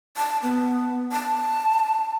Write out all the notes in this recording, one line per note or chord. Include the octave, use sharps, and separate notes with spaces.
A5
B3
A5